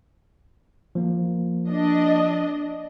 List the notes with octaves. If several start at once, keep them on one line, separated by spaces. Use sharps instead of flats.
F3 A#3
D4 D#5